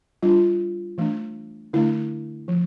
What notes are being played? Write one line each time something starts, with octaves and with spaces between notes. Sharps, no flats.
G3 D4 F4
E3 A3 D4
D3 A3 D4 E4
F3